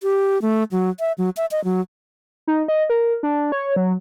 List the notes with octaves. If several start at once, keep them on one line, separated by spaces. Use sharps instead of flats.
G4
A3
F#3
E5
F#3
E5
D#5
F#3
D#4
D#5
A#4
D4
C#5
F#3